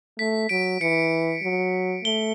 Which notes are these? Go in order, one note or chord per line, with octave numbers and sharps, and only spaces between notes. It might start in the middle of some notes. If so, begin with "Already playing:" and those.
A3 B6
F#3 D7
E3 C#7
F#3
A3 G7